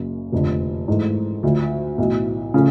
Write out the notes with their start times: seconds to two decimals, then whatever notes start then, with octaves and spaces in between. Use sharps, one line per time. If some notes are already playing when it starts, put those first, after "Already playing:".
Already playing: F#1 F#2 C#3
0.32 F1 F2 D3
0.88 G#2 E3 A3
1.43 D2 D3 F3
1.98 B1 A2 E3
2.54 C#3 F3 A3 C#4